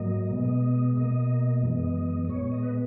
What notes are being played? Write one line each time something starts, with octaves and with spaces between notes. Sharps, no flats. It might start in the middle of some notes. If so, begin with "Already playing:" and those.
Already playing: G#2 F#3 A#3 D#5
B2 G#3 B3
B2 A#3 D#5
F#2 E3 G#3 B3
D#5
A#2 G#3 B3 C#5
D#5
B4